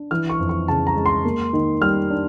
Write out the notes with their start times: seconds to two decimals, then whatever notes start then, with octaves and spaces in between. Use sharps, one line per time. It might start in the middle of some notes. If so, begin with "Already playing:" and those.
Already playing: D4
0.11 E3 F6
0.29 C#6
0.39 F2
0.49 C#6
0.68 C#3 A5
0.87 A#5
0.96 G#3
1.06 C6
1.25 A#3
1.53 D#3
1.81 G3 F6
2.10 D4